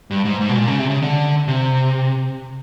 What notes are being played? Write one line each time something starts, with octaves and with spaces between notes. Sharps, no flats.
G2
G#2
G#2
B2
A#2
C#3
C3
C#3
D3
C3